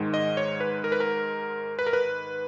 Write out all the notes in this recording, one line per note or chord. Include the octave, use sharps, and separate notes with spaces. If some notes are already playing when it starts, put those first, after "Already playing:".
Already playing: G#2 D#3 G#3
D#5
C#5
B4
A#4
B4
A#4
B4
A#4
B4